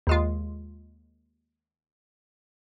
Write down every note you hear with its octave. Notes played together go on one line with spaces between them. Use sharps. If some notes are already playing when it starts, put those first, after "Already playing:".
D#2 G#3 F4